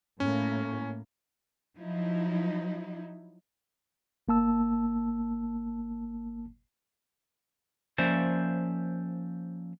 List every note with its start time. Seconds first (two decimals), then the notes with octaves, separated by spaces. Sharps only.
0.20 A2 A#3 C#4
1.78 F3 F#3 D#4 E4
4.28 G1 A#3 A5 E6
7.98 F3 A#3 C#4 C5 D5 E5